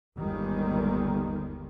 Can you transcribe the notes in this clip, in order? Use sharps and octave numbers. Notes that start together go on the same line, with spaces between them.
G1 D#2 D#3 G3 G#3